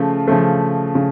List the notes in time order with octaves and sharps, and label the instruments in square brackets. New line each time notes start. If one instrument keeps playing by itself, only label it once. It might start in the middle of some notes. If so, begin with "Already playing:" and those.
Already playing: [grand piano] C#3 F3 A3
C#3 F3 A3
C#3